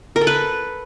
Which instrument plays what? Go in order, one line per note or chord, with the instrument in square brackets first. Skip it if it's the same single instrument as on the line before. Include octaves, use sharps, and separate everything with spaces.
[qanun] A#4
A4
B4